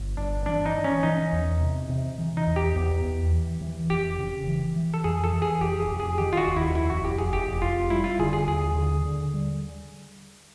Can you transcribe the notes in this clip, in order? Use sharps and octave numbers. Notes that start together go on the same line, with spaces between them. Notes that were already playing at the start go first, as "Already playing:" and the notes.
Already playing: G1
G2 D4
E3 D4
D#4
E3
C#4
E3 D#4
E2
C3
C3
E3
D#4
E2
G4
E2
E2
E3
E3
F1 G4
C#3
E3
E3
A4
F2 G#4
A4
E3
G#4
F1 G4
G#4
F1
G#4
D#3 G4
F4
F#4
D#2
E4
F1 E4
F#4
F1 G4
G#4
F1 G4
F1 F4
G3 E4
F4
D3 G#4
G#4
D#2 G#4
D3
D3
G3